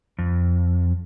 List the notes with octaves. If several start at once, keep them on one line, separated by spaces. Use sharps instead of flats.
F2